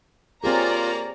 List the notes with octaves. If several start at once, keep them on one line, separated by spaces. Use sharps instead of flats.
A#3 C4 F4 G4 G#4 C#5 D5 A#5